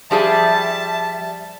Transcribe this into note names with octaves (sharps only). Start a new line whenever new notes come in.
F3 G3 G#4 E5 A5